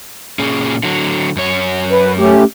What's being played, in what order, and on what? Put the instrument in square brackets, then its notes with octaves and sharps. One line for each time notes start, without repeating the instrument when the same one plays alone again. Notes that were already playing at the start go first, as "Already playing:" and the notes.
[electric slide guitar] A#2 C#4 G#4
D3 F#3
F#2 C#5
[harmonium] B4
A3 C#4 G4